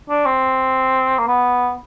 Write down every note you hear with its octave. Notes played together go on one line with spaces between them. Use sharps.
D4
C4
A#3
B3